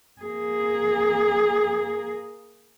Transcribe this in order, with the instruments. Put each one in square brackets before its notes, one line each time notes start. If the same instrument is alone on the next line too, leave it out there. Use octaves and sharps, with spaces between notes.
[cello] A#3 G#4